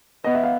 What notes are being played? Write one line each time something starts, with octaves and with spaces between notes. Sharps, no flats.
B3 D#5
E5
F5